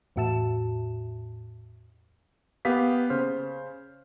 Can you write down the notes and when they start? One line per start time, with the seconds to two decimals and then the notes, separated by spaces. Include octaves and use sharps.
0.16 E2 A2 F#4 E5 A5 E7
2.65 A#3 B3 G4 F5 B6
3.10 C#3 C5 F6